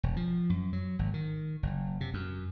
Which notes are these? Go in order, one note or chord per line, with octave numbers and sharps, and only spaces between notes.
E1
F3
F#2
F#3
G#1
D#3
F#1
C3
F#2